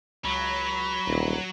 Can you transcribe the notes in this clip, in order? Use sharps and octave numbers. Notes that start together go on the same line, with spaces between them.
C#2 F#3 B5
D#1 C2